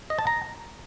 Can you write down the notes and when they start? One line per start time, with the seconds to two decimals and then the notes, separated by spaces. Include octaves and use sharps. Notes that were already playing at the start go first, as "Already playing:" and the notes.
0.10 D#5
0.19 A5
0.27 A#5